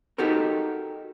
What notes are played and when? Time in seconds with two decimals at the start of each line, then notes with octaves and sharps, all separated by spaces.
0.18 D#4 F#4 G4 A4 A#4